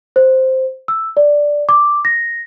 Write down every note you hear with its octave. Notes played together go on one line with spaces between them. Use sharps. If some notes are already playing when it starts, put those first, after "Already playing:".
C5
E6
D5
D6
A#6